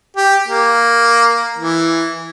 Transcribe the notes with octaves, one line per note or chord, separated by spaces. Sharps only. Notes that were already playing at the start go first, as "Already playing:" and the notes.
G4
A#3
E3